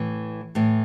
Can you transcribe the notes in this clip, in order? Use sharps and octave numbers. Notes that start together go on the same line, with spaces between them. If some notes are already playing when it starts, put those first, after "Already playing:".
Already playing: A2 E3
A2 E3